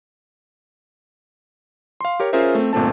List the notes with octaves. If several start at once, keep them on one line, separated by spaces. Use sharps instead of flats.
F5 C6
G4 A#4 C#5
C#4 F4 G#4 A#4 C5 E5
A3 C4
G1 A#2 A3 C4 A5